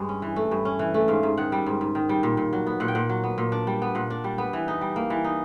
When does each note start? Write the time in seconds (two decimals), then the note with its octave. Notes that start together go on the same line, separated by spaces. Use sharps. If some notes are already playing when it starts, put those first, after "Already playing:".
Already playing: G2 G#3
0.09 C#4
0.22 E3
0.36 A3
0.51 G2
0.65 C#4
0.79 E3
0.94 A3
1.08 G#2 F5
1.23 G#2
1.37 D#3 F#5
1.52 G3
1.66 G#2
1.81 G#2
1.95 D#3
2.09 G3
2.23 A#2
2.37 A#2
2.53 F#3
2.66 B3
2.80 A#2 F#5
2.88 G5
2.95 A#2 F#5
3.09 F#3
3.24 B3
3.38 A#2
3.52 D4
3.67 G3
3.82 B3
3.95 A#2 F#5
4.10 D4
4.24 G3
4.38 B3
4.53 E3
4.68 D#4
4.81 G3
4.96 A#3
5.10 E3
5.24 D#4